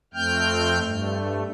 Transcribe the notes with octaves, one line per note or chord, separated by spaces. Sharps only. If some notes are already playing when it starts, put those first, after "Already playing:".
F2 A3 C4 G5 F6 G6
G2 A3